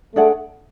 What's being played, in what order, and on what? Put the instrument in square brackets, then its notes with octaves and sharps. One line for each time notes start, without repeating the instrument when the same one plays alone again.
[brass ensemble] A3 [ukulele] D4 G#4 D5 F#5